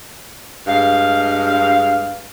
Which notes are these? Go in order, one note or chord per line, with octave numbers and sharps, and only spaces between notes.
G2 G#3 F5